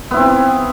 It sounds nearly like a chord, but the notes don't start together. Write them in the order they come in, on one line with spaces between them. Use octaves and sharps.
B3 E4 C4